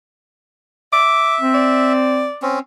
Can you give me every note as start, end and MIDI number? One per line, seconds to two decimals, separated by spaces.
0.93 1.93 76
0.93 1.36 86
1.40 2.28 60
1.54 2.42 74
2.42 2.59 60
2.42 2.59 61